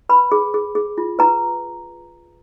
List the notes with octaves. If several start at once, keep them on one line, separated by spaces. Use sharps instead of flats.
B4 B5
G#4
G#4
G#4
F4
B4 A#5